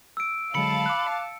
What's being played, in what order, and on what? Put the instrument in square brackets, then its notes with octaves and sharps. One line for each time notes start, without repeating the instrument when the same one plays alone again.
[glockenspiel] E6 D7
[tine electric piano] D3 F#3 G#3 [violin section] F5 A5 [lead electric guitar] B5 [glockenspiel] C#7
[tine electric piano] D6 F#6